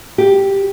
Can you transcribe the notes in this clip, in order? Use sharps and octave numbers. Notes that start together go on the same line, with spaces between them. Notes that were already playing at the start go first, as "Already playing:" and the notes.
G4